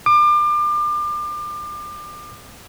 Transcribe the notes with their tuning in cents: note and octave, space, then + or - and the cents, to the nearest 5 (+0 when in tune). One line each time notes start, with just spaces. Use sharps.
D6 +30